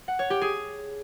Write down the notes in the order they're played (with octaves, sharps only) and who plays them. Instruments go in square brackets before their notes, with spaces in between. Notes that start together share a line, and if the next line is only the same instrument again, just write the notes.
[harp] F#5
C#5
G4
G#4